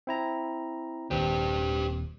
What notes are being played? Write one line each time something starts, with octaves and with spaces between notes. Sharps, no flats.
C4 E4 A#5
D#1 D#2 C4 G4 B4